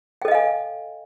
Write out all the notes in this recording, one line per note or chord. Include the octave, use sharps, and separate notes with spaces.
A4 D#5 F5 G5 G#5